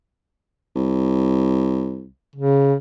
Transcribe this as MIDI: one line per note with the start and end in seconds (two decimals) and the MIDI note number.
0.76 2.07 36
2.36 2.74 49